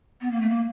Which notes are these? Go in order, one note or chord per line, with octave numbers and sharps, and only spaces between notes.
B3
A#3
A3
A#3